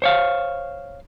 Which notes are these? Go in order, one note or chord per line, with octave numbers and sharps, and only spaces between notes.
C5 C#5 F5